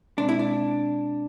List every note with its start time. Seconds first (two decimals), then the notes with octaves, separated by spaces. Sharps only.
0.17 B2 G#3 C4 D4
0.29 E4
0.39 D4